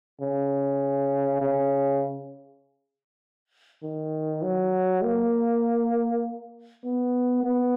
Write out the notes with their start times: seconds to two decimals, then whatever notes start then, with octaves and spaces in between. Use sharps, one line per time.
0.21 C#3
1.41 C#3
3.83 D#3
4.43 F#3
5.03 A#3
6.84 B3
7.43 B3